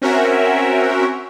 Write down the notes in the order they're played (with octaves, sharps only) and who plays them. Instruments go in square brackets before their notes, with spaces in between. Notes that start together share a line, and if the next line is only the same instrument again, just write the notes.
[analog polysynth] C4 C#4 F#4 A#4 E5